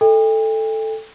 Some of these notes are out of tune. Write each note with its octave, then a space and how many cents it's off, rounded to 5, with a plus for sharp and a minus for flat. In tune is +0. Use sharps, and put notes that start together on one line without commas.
A4 +0 D#5 +40 G5 +40